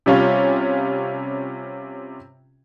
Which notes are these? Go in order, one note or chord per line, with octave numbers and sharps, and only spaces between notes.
C3 G3 C#4 F4 C#5